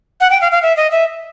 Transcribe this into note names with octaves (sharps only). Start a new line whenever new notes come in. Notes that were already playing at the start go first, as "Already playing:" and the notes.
F#5
G5
F5
F5
E5
D#5
E5